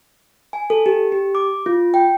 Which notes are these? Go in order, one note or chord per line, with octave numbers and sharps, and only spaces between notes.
G#5
A4
G4
G4
D6
F4
G5